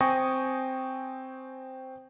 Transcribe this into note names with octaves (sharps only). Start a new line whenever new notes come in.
C4 G5 G#5 C#6 D#6 A#6